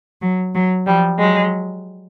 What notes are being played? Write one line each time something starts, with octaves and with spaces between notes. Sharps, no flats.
F#3
F#3
F3 G3
F#3 G#3